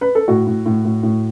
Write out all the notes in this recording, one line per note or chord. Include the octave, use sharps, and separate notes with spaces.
B4
A4
A2 F#4
A2
A2
A2
A2